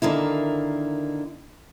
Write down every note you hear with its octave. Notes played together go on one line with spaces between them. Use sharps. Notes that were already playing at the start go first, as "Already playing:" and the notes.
D3 D#3 A#3 E4